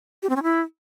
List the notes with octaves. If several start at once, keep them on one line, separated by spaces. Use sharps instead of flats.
G4
C4
C#4
E4